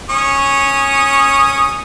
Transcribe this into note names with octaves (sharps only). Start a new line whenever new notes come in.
C#4 C#6 D#6